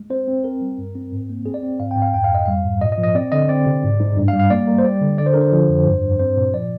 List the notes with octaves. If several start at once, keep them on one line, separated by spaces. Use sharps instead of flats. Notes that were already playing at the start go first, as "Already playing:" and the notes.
Already playing: G#3
C4 C5
C4
C4 A#4
G3
G2
C4
G#2
A#3
C4 G#4
D5
C4
G#2 F5
G5
G#2
F5
F2 G5
F5
F2 D#5
G3 F5
G#2
A#2 D#5
D#5
F3
D#5
C4 D5
D3 D#5
C4 D5
C3
G#2
G#2
G2
F5
G3
F5
A#3 D5
A#3
C5
G3 D5
D3
D3 D5
C5
D3 A#4
C5
F3
F2
G2
G2
C4 C5
A#2
F3 D5